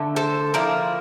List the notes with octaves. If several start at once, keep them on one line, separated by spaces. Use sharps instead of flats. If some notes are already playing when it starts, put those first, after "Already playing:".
Already playing: D3 A3
A4 C5
F3 A#3 E4 A#4 D5